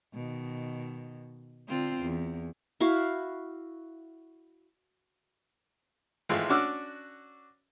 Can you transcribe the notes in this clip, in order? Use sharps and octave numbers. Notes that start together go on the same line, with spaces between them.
B2 D#3
D3 C4 F4
E2
E4 F#4 F5
G#1 E3 G#3 A3 F4
C#4 D4 F#4 D6 E6 F6